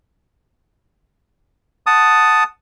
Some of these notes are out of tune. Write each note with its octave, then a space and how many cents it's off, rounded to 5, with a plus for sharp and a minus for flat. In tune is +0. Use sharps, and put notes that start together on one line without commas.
F#5 +0 A5 +0 D#6 +0